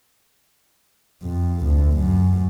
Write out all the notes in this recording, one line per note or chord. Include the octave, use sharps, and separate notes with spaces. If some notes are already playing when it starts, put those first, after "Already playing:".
F2
D2
F#2